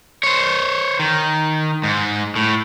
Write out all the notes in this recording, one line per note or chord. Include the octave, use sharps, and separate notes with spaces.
C5 C#5
D#3
G#2
A2